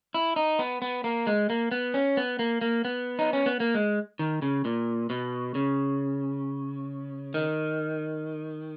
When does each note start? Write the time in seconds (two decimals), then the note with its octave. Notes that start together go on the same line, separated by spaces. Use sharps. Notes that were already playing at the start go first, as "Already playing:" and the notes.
0.14 E4
0.36 D#4
0.59 B3
0.82 B3
1.04 A#3
1.27 G#3
1.50 A#3
1.71 B3
1.94 C#4
2.17 B3
2.39 A#3
2.61 A#3
2.85 B3
3.19 D#4
3.33 C#4
3.46 B3
3.60 A#3
3.75 G#3
4.19 D#3
4.42 C#3
4.65 A#2
5.10 B2
5.55 C#3
7.34 D#3